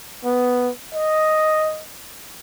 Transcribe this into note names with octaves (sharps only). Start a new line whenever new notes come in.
B3
D#5